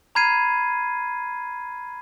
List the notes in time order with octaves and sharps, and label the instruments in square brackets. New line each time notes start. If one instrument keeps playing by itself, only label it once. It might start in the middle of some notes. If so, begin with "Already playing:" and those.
[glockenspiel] A#5 B5 F6 G#6 C7 D#7